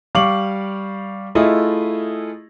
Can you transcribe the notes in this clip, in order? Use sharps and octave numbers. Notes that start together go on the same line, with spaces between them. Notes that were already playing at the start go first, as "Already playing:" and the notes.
G3 F5 C#6 D6 F#7
A3 E4 F4 G#4 D#5